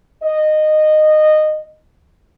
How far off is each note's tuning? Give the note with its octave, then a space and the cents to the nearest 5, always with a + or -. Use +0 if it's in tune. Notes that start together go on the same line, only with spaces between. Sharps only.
D#5 -15